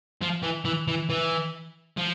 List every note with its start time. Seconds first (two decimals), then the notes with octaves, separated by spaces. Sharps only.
0.22 F3
0.43 E3
0.65 E3
0.88 E3
1.10 E3
1.97 F3